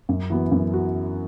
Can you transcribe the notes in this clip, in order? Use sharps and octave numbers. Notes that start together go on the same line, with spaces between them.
F#2
E3 B3 F#4
F#2
F#4